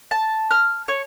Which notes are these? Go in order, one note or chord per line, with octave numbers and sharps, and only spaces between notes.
A5
F6
C#5